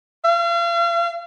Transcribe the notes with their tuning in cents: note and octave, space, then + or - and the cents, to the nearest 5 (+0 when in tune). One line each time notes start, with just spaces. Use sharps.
F5 -40